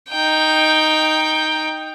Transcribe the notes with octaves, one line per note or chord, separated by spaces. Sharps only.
D#4 G5